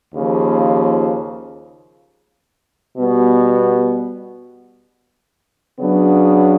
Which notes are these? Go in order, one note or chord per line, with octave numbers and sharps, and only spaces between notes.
D#2 C#3 F3
B2 G3 B3
C#3 F#3 B3 D4